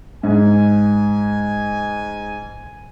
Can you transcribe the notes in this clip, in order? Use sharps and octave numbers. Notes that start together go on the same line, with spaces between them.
G#2 G#5